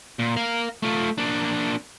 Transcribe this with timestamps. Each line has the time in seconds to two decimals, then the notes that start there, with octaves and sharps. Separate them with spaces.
0.19 A#2
0.36 A#4 F5
0.83 A3 F4
1.18 A#3 D4